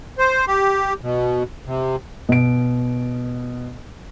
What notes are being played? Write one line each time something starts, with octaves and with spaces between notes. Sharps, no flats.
C5
G4
B2
C3
B2 D7